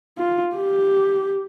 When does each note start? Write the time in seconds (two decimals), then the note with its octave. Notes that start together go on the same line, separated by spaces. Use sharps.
0.19 F4
0.55 G4